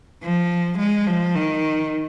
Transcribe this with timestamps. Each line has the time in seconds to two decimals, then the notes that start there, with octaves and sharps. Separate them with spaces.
0.23 F3
0.78 G#3
1.07 F3
1.36 D#3